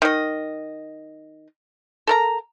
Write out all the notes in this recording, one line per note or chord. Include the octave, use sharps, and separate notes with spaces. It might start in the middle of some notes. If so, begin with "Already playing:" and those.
D#3 D#5
A4 A#4 A#5